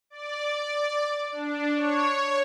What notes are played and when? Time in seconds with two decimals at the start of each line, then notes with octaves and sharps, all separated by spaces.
0.10 D5
1.32 D4
1.77 C#5